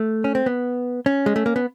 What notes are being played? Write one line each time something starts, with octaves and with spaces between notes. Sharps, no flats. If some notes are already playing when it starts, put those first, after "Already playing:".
Already playing: A3
C#4
C4
B3
C#4
G#3
A3
A#3
B3